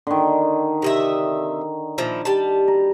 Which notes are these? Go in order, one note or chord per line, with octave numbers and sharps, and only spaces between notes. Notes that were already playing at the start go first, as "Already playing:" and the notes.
D3 D#3
C3 D#5 E5
A#2 F3 E4
G3 A5
A#5